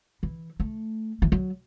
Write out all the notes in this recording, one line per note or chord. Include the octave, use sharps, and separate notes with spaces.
E3
A3
E3
F#3